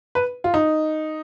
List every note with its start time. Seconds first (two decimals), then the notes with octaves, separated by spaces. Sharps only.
0.15 B4
0.44 F4
0.54 D#4